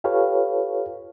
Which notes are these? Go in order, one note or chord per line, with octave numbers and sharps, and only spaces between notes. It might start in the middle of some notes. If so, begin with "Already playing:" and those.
F4 G4 A4 B4 C#5 F5